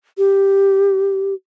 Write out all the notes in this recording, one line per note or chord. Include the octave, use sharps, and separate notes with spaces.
G4